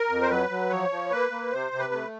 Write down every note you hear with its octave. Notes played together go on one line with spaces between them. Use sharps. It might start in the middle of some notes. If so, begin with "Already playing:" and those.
Already playing: A#4
F2
C5
F#3 B4
F#3
F3 C#5
F3
A#3 B4
A#3
C3 C5
C3
B4
A3